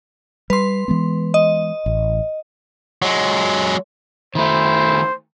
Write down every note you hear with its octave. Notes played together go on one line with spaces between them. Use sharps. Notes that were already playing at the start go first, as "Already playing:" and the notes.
G3 B4 C6
E3 G#3 B3
D#5
A1
F#3 G#3
D#3 A3 E4 C5